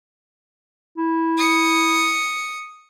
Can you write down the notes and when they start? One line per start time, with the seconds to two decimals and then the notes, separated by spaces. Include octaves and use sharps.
0.98 E4
1.38 D#6 C#7